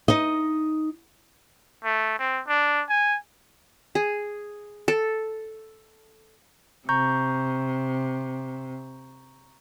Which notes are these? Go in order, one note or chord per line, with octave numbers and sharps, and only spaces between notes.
D#4 D#5
A3
C4
D4
G#5
G#4
A4
C3 A#5 C#6 G6